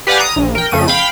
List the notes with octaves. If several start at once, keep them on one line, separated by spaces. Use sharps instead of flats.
G4 B4 D5 F5 F#5 G#5
A#5 D#6
A#1
A#4 G5
F2 C#3 A3 D#7
F5 G5 B5